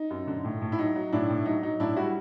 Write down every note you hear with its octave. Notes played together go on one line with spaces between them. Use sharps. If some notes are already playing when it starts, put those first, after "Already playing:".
Already playing: D#4
F#2
D3
A2
A2
E4
F#3 D#4
F#3
A2 D4 E4
A2
F#3 D#4
F#3 D#4
A2 D4 E4
G3 E4 F#4